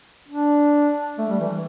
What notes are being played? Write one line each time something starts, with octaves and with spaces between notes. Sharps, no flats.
D4
A3
G3
E3